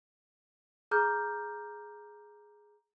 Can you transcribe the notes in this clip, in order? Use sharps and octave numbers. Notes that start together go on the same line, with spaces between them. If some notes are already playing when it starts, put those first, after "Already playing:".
G#4 A#5 D6 F6 G6